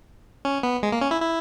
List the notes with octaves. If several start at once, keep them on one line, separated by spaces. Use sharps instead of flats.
C#4
B3
G#3
A#3
C#4
E4
E4